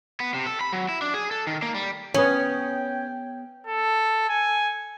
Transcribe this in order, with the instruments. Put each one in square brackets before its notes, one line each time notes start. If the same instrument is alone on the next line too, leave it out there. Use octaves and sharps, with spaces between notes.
[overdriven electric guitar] B3
C3
A4
B5
F#3
E4
D4
G#4
A4
D#3
A#3
G3
[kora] B3 G#4 C#5 [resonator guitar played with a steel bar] C#4 [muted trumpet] G5
[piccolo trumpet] A4
G#5